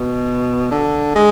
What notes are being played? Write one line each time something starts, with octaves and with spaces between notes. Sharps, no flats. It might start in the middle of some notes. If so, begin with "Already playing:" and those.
Already playing: B2
D3
G#3